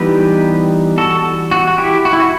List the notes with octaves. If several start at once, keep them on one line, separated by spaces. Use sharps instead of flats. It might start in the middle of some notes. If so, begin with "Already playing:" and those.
Already playing: E3 G3 B3 D#4 G4 B4
F#4 A4
F#4
F#4
E4 G4
F#4
E4
F#4